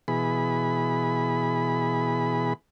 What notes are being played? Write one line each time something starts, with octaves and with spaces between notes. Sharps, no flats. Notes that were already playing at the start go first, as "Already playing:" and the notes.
B2 E3 G#4 B5